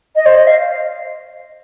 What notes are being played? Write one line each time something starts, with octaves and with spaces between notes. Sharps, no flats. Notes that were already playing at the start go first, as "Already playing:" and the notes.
D#5
C5
D#5
F5